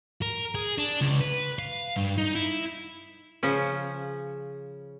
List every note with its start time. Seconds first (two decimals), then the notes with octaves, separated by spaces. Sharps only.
0.22 A#4
0.55 G#4
0.78 D4
1.01 C#2
1.20 B4
1.59 F5
1.97 G2
2.18 D#4
2.35 E4
3.43 C#3 F3 C#4